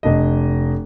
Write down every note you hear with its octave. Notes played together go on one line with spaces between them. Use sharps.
F1 D4 D#5